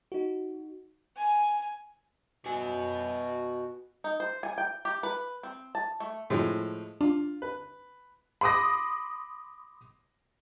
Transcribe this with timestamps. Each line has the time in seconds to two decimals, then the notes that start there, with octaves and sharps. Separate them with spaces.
0.12 D#4 F#4
1.17 G#5
2.46 B2 F#4 G#5
4.04 D#4
4.20 C5
4.43 G#5
4.58 G5
4.85 G4
5.03 B4
5.43 C4
5.75 A5
6.00 A3
6.30 A2 F3 G#3
7.01 D4 F4
7.42 B4
8.41 B5 C6 D6 D#6 A#6